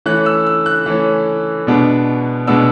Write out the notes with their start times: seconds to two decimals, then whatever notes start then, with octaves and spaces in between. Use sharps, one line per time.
0.06 E3 A3 C#4 F#6
0.26 E6
0.47 E6
0.66 F#6
0.86 E3 A3 C#4
1.67 B2 G#3 B3 D4
2.47 B2 G#3 B3 D4 E6